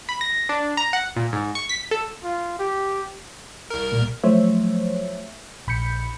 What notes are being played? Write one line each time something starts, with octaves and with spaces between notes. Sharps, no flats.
B5
A#6
D4
A#5
F#5
A#2
G#2
C#6
B6
A4
F4
G4
C2 A#4
A#2
F3 F#3 A3 C5 C#5 E5
A#1 B5 G6 C#7